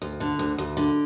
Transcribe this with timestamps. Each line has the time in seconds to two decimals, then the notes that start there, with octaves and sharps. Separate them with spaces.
0.02 D2
0.20 D3
0.39 D2
0.58 D2
0.77 D3